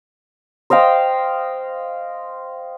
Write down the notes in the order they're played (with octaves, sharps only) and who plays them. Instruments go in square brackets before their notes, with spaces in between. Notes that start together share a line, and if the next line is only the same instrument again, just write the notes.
[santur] C5 D#5 F5 G5